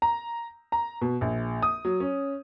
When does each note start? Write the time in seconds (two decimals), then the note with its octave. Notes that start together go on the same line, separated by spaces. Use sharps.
0.02 A#5
0.72 A#5
1.01 B2
1.21 A#1
1.62 D#6
1.85 F#3
2.00 C#4